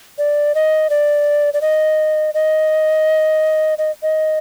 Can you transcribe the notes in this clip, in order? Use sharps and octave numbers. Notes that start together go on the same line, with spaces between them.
D5
D#5
D5
D5
D#5
D#5
D#5
D#5